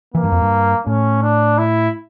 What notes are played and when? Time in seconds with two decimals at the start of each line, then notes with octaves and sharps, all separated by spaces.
0.14 E3 A#3
0.24 G2
0.32 F2
0.42 G2
0.86 A2 C#4
1.22 D4
1.58 E4